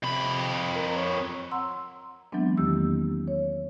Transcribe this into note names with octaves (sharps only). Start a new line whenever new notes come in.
F2 C3 B5
A#4
C#5
F#5 A#5 C6 E6
E3 F#3 G#3 B3 C4 D4
E2 D#3 A#3 C4 G4 E6
C#5